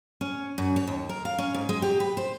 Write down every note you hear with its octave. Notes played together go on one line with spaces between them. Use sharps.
C#4
F#2
C#5
D#2
A#4
F5
C#4
G#2
G#3
G4
B4
C5